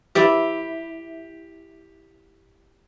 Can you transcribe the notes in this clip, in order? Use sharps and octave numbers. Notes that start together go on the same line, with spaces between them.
E4 G4 D5 E5